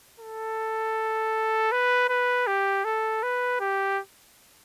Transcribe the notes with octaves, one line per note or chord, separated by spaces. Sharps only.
A4
B4
B4
G4
A4
B4
G4